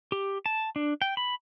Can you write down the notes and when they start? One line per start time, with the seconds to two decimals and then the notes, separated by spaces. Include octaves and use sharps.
0.12 G4
0.46 A5
0.76 D4
1.02 G5
1.17 B5